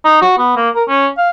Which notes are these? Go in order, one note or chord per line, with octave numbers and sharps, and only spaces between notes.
D#4
F#4
B3
A#3
A#4
C#4
F5